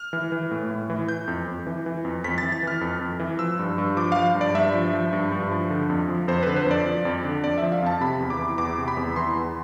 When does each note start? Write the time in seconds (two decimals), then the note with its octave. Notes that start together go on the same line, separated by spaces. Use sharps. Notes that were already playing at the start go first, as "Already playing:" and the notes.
Already playing: F6
0.13 E3
0.32 E3
0.51 A2
0.71 A2
0.90 E3
1.08 E3 G6
1.28 F2
1.48 F2
1.67 E3
1.86 E3
2.05 F2
2.24 F2 B6
2.38 E3 A6
2.52 A6
2.63 E3 F6
2.81 F2
3.01 F2
3.20 E3
3.39 F3 E6
3.59 G2
3.78 G2
3.97 F3 D6
4.12 F3 F5
4.35 G2
4.41 D5
4.55 G2 E5
4.74 F3
4.93 F3
5.13 G2
5.32 G2
5.51 F3
5.70 D3
5.90 F2
6.09 F3
6.28 F2 C5
6.43 D3 B4
6.56 C5
6.66 F2 D5
6.86 F3
7.05 F2
7.24 D3
7.44 F2 D5
7.58 F3 E5
7.72 F5
7.82 F2 A5
8.01 C3 B5
8.20 E2
8.30 D6
8.39 E3
8.58 E2 D6
8.78 C3
8.88 B5
8.97 E2
9.16 E3 C6
9.36 E2